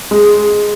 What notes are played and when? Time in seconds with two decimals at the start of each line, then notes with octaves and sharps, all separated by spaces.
0.11 G#3